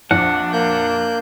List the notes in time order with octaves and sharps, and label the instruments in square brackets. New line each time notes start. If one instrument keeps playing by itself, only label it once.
[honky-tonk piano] A#1 F2 [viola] D4 [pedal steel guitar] F#5
[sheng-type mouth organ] A#3 F#6 G6